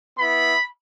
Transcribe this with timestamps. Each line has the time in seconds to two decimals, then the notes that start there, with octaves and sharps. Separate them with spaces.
0.17 B3 E4 B5